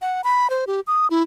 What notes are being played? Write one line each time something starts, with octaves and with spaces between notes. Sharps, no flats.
F#5
B5
C5
G4
D#6
E4